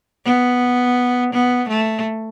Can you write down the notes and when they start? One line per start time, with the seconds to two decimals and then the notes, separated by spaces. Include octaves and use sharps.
0.25 B3
1.33 B3
1.69 A3